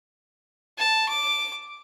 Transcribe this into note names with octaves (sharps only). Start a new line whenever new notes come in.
A5
D6